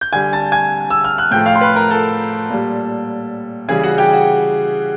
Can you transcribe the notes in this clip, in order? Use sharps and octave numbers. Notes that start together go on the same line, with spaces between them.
G6
D3 G3 G#5 G#6
A5 A6
G#5 G#6
E6
F6
F#6
A2 F3 A3 G5 G6
F5 F6
C6
B4 B5
A#4 A#5
A4 A5
A#2 G3
C#3 E3 G3 G#4 G#5
F#4 F#5
G4 G5
F#4 F#5